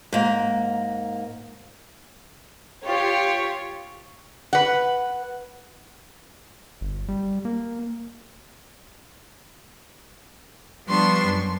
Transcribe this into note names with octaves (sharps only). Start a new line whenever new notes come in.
G#2 A#3
F4 G4 C#5
B4 F#5
G1
G3
A#3
F3 G3 B3 D4 C6 C#6
F#2